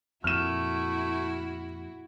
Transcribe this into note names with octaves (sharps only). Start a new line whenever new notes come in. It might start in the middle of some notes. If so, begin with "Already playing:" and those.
F2 A#2 A3 E4 F#4 F6 E7